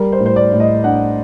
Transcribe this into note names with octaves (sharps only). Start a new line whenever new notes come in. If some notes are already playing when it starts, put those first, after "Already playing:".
Already playing: G3 A#4
C5
A2
C5
D5
A2
D#5
D4 F#5